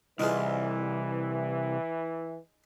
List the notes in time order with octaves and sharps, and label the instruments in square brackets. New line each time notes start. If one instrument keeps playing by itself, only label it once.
[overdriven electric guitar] C2 [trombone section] E3 [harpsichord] D#4 F4 G#4